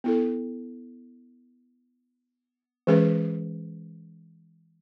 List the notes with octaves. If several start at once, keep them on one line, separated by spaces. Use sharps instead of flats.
B3 E4 A4
E3 G#3 C#4 G#4 B4